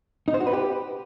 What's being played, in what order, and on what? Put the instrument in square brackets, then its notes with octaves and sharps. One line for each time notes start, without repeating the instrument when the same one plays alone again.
[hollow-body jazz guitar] D#4
C5
F#4
B4
G4